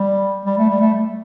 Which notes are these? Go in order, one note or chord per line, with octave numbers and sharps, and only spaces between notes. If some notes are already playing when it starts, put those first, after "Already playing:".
Already playing: G3
G3
A3
G3
A3